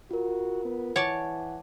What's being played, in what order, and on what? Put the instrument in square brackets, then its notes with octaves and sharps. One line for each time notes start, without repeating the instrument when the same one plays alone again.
[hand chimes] F4 A#4 [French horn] F#4
[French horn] B3
[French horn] E3 [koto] C#5 D5 A5 [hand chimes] F#5